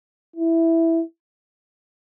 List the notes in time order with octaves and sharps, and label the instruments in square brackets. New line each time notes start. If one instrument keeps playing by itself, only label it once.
[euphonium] E4